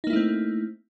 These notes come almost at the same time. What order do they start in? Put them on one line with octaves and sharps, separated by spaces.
D#4 A#3 E4 A3 C4